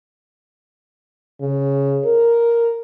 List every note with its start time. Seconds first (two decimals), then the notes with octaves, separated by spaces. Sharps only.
1.41 C#3
2.05 A#4